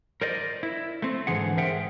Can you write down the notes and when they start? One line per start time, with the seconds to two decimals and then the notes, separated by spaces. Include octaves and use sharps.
0.22 A#4 C5 D5 D#5
0.63 E4
1.02 A3 C4
1.27 G#2 D3 E3 G#4 F#5
1.57 G#4 A#4 C5 E5 F#5 G5